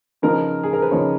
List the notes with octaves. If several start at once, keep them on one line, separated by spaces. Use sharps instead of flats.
C#3 F3 B3 D#4 A#4
G#4
A#4
B4
C#3 F3 B3 D#4 C#5